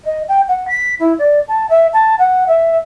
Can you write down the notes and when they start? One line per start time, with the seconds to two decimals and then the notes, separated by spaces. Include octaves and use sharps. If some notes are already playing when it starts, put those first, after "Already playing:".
0.04 D#5
0.28 G5
0.48 F#5
0.67 B6
0.99 E4
1.18 D5
1.48 A5
1.69 E5
1.93 A5
2.18 F#5
2.47 E5